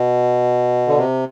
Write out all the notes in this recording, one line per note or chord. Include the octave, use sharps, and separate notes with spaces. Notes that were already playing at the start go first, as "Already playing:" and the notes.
Already playing: B2
D3
C3